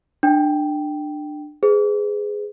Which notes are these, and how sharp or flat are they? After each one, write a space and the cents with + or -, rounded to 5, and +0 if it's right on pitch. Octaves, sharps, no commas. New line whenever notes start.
D4 +25 G5 -5
G#4 +0 B4 +45